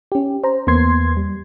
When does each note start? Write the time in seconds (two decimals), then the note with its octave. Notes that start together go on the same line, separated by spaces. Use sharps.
0.12 C#4 G4
0.44 C5 A#5
0.67 E2 A#3 B3 C6 G#6 C7
1.17 G3